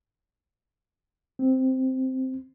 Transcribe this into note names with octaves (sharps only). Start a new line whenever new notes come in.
C4